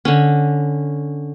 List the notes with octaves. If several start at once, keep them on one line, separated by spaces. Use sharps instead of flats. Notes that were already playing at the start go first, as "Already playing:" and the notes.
D3 C#4